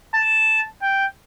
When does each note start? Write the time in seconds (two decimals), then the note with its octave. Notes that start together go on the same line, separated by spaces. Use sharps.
0.15 A5
0.82 G5